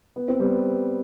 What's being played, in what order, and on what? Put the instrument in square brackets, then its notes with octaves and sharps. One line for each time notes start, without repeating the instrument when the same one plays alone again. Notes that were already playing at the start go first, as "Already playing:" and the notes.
[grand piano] B3
C4
G3 B3